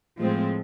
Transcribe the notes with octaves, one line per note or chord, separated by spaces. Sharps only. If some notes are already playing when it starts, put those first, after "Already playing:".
A2 F3 G#3 C4